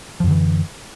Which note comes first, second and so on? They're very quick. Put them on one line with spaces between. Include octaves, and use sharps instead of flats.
F3 F#2 D3 E3